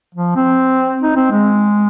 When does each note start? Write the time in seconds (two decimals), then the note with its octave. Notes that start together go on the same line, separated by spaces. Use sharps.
0.15 F3
0.36 C4
1.02 D#4
1.16 C4
1.31 G#3